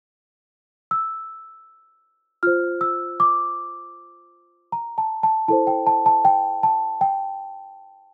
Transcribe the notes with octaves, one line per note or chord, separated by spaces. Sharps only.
E6
F4 C5 F6
E6
D6
A#5
A5
A5
E4 A4 C5 A5
G5
A5
A5
G5
A5
G5